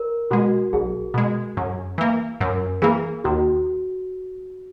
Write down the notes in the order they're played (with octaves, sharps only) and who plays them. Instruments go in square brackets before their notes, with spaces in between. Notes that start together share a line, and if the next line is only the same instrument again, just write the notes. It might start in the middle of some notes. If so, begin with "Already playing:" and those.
Already playing: [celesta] A#4
[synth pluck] B2 G#3 [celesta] F#4
[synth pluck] B1 [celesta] G#4
[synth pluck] B2 G#3
F#2
E3 A#3
[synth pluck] F#2 [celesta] A#4
[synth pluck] E3 A#3 [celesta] G#4
[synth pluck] D#2 [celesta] F#4